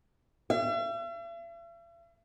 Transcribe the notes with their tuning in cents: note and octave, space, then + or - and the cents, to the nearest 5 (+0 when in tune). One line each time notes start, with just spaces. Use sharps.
E5 +45